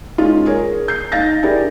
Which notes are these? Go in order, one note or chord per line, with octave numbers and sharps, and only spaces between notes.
G#3 C#4 D#4 F4
G#4 A#4 C#5
G6 C7
D#4 F5 A6 A#6
D4 E4 G4 G#4 A#4 D5